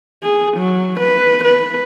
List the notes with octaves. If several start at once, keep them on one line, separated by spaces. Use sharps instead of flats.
G#4
F#3
B4
B4